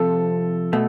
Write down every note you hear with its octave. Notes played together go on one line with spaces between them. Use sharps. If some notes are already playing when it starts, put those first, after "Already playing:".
Already playing: C3 F3 C4 F4 A4
B2 A3